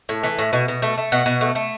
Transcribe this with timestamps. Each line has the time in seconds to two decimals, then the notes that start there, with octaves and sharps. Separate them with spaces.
0.09 A2
0.23 E3
0.39 A2
0.53 B2
0.68 B2
0.82 A3
0.98 A3
1.12 B2 F#5
1.26 B2
1.41 A3
1.55 A3